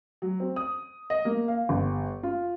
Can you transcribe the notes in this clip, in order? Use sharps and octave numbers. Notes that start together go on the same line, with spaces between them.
F#3
C4
D#6
D#5
A#3
F5
G1
F4